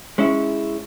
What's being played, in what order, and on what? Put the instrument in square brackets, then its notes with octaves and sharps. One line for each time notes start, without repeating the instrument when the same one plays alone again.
[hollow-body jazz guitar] G#3 C#4 E4